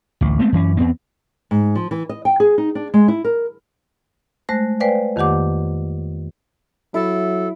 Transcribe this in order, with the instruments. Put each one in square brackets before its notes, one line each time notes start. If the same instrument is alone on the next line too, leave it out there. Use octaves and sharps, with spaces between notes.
[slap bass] A1 D2
G#3 A3 B3 C4
F#2 E3 C#4
E2 B3 C4
[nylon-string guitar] G#2
F3
E3
D#5
G5
G#4
D#4
D4
G#3
E4
A#4
[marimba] G#3 A3 C5 F#6 A#6
B4 C5 D5 F5 G5 G#5
F2 D#3 A#3 G4 F#5 D6
[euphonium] F#3 [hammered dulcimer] E4 [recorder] A4